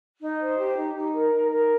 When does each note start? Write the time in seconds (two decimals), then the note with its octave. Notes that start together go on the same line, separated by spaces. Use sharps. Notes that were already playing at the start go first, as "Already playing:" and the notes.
0.20 D#4
0.39 C5
0.57 G4
0.76 D#4
0.95 D#4
1.14 A#4
1.33 D#4
1.51 A#4